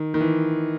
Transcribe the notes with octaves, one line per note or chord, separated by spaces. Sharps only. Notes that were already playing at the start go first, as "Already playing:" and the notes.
Already playing: D#3
D#3
E3